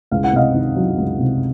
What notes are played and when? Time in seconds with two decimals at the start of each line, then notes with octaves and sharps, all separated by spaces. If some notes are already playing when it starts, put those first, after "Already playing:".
0.11 C#2 F5
0.24 F#5
0.33 C3 D#5 F5
0.54 D#3
0.76 F#3
0.97 C#2
1.19 C3